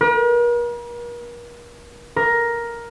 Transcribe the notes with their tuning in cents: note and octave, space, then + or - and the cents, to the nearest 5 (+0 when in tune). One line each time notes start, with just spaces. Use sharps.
A#4 +45
A#4 +10